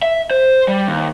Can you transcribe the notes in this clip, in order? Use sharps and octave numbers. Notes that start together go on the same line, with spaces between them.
E5
C5
G3
D#2